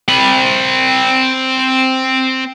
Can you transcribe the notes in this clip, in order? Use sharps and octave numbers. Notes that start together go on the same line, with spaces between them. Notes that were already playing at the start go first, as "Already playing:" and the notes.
C4 B5